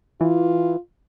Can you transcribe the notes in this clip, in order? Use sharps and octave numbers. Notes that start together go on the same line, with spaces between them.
E3 F4